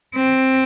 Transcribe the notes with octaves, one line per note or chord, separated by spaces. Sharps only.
C4